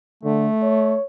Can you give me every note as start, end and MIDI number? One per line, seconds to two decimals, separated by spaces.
0.23 0.48 50
0.23 0.95 57
0.62 1.04 73